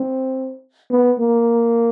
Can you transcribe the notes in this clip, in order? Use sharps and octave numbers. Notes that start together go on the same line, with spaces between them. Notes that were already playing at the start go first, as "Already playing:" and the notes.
Already playing: C4
B3
A#3